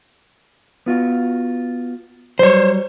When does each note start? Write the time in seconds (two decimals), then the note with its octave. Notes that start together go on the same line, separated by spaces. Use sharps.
0.86 B3 F4 F#4
2.39 F#3 G3 C5 C#5